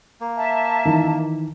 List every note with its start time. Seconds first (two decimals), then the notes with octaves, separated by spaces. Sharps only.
0.21 A#3
0.36 E5 A5
0.85 D#3 E3